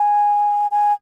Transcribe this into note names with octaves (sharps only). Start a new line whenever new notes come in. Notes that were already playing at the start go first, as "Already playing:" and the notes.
Already playing: G#5
G#5